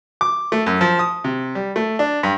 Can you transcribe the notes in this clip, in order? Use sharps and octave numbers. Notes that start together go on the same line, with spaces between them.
D6
A3
F#2
F3
D#6
C3
G3
A3
D4
G2